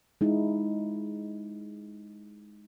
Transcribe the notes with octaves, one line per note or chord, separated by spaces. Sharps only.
G#3 D#4 E4